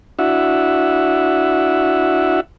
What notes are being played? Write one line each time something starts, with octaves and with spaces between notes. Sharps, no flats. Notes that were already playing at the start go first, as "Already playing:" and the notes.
D4 E4 F#4 E5 F#5